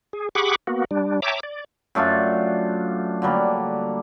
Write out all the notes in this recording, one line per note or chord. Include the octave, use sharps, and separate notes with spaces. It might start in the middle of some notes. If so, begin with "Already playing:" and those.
G#4
G4 G#4 F#5 B5 C#6 D6
A#3 B3 F#4
G3 D4
C#5 E5 G5 A5 A#5 D6
D5
F#2 A3 D4 F4
D3 F#3 G3 A#3